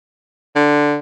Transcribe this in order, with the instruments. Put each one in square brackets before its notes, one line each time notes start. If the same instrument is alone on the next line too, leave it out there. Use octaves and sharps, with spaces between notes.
[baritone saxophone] D3